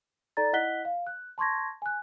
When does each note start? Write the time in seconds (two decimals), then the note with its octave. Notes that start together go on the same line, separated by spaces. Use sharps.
0.37 D#4 A4 D5 A#5 A6
0.53 E4 D#5 F#5 F#6 B6 G7
0.85 F5
1.07 F#6
1.38 A5 C6 C#6 G#6 A#6
1.82 G#5 F#6